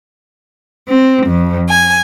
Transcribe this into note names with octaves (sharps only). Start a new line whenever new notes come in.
C4
F2
G#5